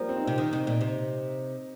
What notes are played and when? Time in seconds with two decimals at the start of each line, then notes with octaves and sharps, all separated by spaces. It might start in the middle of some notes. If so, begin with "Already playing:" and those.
Already playing: F3 G3 A#3
0.09 C4
0.16 D#4
0.24 C4
0.27 C3
0.38 D#3 D#4
0.53 C3
0.67 A#2
0.81 C3